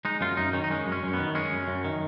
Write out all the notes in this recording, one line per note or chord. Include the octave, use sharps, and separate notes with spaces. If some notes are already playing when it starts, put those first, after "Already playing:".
G#3 D#4
F#2 F4
F#2 D#4
D#3 C#4
D#4
G#3 C#4
F#2
C#4
F#2
B3
D#3
G#3 C#4
F#2
F#2
D#3